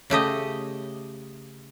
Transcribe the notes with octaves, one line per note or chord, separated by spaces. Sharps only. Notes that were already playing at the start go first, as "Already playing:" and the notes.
C#3 A3 G4 D#5